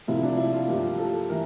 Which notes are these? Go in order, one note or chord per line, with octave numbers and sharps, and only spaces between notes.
C2 C3 F3 A#3 E4
D4
E4
F4
G2 F3 A#3 G4
A4
E3 A#4